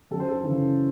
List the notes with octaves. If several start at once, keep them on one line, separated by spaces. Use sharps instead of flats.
F#2 A4
C5
A4
C#3 E3